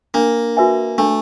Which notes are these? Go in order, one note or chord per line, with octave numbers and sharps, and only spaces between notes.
A#3 D4
F#4 B4 E5 G#5
A3 D4